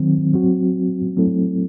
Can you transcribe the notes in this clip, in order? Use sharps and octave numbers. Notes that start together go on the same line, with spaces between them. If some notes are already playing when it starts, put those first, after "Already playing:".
Already playing: D#3 F#3 C4
F#3 C4 F#4
F#3 A3 C4 E4 A4